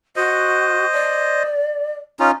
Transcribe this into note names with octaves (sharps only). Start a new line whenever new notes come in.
F#4 C5 D#5
D5
C#4 D#4 F4